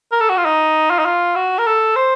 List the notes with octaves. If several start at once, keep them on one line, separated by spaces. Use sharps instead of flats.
A#4
A4
F#4
F4
D#4
F4
D#4
F4
F#4
A#4
A4
C5